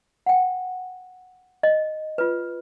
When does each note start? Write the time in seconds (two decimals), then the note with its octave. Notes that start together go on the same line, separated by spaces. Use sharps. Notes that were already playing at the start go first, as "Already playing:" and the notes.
0.26 F#5 G5
1.63 D#5
2.18 F4 B4